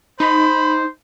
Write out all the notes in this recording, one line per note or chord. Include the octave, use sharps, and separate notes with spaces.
D#4 C5 B5